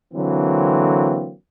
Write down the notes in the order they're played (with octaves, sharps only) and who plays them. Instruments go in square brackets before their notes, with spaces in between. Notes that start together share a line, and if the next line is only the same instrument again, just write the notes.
[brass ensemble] D3 E3 F#3 A#3 C4